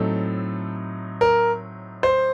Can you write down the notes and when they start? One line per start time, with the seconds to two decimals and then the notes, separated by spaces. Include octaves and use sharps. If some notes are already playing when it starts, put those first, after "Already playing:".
Already playing: A2 F#3 C4 D#4 A4
1.21 A#4
2.03 C5